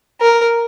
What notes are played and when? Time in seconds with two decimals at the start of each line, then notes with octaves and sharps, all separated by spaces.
0.21 A#4